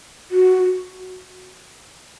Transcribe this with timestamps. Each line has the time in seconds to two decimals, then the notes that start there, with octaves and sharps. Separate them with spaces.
0.31 F#4